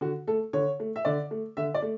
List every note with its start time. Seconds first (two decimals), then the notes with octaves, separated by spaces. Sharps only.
0.01 D3 F#4
0.27 A3 A4
0.53 D3 C#5
0.80 A3
0.96 E5
1.05 D3 D5
1.31 A3
1.57 D3 E5
1.74 D5
1.82 A3